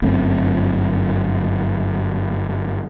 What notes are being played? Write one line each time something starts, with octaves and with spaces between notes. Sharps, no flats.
G1 F#2 A3 C4